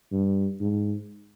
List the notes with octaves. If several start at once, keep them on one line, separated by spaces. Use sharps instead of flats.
G2
G#2